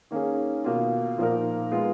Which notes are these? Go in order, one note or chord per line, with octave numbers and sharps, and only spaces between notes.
D#3 A#3 C#4 G#4
B2 A#3 F4
A#2 F3 A#3 D#4 A#4
G#3 B3 F4